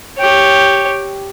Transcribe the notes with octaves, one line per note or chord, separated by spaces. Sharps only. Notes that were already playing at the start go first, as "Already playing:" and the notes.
G4 C#5